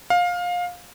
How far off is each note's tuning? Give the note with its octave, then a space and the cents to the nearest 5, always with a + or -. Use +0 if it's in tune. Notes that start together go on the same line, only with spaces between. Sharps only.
F5 +20